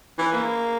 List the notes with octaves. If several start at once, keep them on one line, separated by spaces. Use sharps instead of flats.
E3
A#3